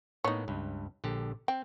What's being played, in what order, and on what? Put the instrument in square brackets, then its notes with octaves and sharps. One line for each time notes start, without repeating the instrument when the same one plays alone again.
[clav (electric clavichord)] A2 A#3 B3 [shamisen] D#4 C#5
[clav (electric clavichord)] C#2 G2
A#1 D3 G4
[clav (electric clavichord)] C4 [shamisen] G5